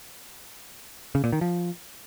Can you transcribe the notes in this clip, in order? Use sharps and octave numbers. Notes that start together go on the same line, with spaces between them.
C#3
A#2
D#3
F3